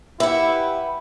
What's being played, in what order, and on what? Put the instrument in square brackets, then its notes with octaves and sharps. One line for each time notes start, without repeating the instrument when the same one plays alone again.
[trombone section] E4 G4 [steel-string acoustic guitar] B4 F#5 [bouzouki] E5